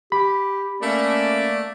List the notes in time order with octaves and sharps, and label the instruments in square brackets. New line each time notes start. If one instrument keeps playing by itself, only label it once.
[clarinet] G4 [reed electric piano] B5
[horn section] A3 A#3 D5 [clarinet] C#4